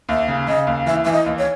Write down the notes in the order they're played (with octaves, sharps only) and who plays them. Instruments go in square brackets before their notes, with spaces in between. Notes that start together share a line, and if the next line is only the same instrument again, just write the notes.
[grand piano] D#2 [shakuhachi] E5
[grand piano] C#3
[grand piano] C#3 [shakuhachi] D#5
[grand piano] D#2
[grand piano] E3 [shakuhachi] E5
[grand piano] E3 [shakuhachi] E5
[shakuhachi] D#5
[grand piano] D#2
[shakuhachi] C#5